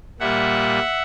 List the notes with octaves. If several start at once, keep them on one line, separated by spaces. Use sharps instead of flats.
A#2 G3 A#3 E5 F#5